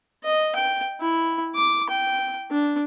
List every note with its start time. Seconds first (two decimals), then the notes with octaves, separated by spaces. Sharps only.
0.24 D#5
0.56 G5
1.01 E4
1.55 D6
1.90 G5
2.51 D4